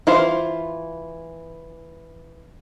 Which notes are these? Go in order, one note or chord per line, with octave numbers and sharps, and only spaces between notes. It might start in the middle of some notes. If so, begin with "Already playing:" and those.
E3 F4 C5